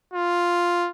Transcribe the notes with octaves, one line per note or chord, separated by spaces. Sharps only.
F4